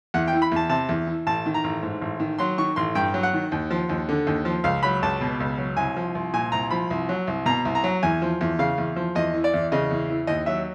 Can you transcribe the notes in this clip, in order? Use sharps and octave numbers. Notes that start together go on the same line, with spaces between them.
E2 F#5
G5
E3
B5
E2 A5
C3 A5
E2
E3
A1 A5
D#3
A#5
A1
G#2
A1
D#3
F#3 C6
D#3 C#6
A1 C6
G2 G5
F#3
F#5
D#3
D#2
F3
D#2
D3
D#2
F3
C#2 F5
F#3 B5
C#2 A5
B2
C#2
F#3
C2 G#5
F3
C2
A#2 G#5
C2 A#5
F3 B5
C2
F#3
C2
B2 A#5
C2
A#5
F#3
E2 G#5
F3
E2
C#3 F5
E2
F3
E2 D#5
E3
D5
E2
C#3 D#5
E2
E3
D#2 D#5
F#3 E5